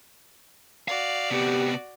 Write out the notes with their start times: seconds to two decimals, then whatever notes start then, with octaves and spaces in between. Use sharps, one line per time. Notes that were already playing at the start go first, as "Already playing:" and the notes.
0.88 F#4 D5 F5
1.30 C3 B3 G4